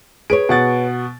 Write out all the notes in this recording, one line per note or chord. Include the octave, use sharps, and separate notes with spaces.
G#4 B4 C#5 D7
B2 F#5 A6